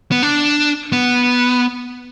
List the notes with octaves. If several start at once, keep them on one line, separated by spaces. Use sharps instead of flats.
B3
D4
B3